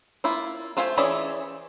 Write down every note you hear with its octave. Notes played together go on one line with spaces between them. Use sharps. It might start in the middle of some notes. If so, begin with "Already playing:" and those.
A#3 E4 F4
A3 F4 C5 E5 G#5
E3 C#4 G#4 D5 E5